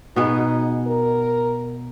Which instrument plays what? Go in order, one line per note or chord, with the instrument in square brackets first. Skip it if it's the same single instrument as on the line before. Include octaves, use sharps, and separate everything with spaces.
[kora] B2 B3 G#4 [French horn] D#4
[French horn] A#4